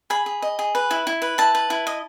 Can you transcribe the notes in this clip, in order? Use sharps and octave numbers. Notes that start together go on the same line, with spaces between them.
G#4 B5
G#4
D#5
G#4
B4
E4
E4
B4
E4 A5
B4
E4
D#5